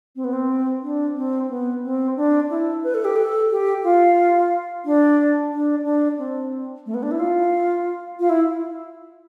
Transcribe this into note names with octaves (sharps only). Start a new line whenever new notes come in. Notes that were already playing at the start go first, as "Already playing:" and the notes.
C4
B3
C4
D4
C4
B3
C4
D4
E4
B4
A4
G4
A4
G4
F4
D4
D4
D4
C4
A3
B3
D4
E4
F4
F4
E4